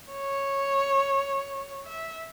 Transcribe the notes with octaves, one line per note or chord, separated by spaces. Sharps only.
C#5
E5